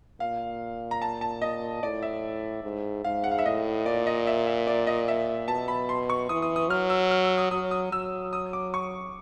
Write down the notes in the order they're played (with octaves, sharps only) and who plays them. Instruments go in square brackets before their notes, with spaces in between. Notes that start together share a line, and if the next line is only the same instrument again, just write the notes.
[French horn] A#2 [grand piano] F5
[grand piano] A#5
A5
A5
D#5
[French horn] A2 [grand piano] D5
[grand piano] E5
[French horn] G#2
[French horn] G#2 [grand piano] F5
[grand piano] F#5
F5
E5
[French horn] A2 [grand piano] D#5
[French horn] A#2 [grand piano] D5
[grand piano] D#5
E5
E5
D5
D#5
E5
[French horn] B2 [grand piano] A5
[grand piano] B5
C6
C#6
[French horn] E3 [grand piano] D#6
[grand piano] D#6
D#6
[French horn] F#3 [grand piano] F6
[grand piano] E6
F6
E6
D#6
[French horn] F#3 [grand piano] D#6
[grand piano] D#6
[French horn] F#3 [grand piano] E6
[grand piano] D#6
D6
C#6